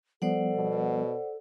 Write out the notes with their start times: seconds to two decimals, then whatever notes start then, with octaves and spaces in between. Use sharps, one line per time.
0.22 F3 G3 B3 A4 C5 D5 F#5
0.56 B2